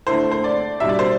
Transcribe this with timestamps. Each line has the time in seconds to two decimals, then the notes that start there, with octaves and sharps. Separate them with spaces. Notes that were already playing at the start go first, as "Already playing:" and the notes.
0.07 D3 A3 E4 C5
0.32 C5
0.44 D5
0.80 B2 G3 D4 E5
0.89 D5
0.99 C5